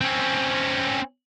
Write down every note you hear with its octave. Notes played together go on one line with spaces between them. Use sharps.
C4 C#4